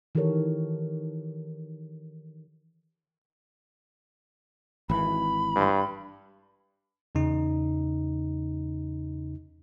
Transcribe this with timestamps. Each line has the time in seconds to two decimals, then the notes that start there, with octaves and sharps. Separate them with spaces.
0.15 D#3 E3 G4 A4 A#4 C#5
4.90 G#1 E3 B5
5.56 G2
7.15 E2 C#3 D#4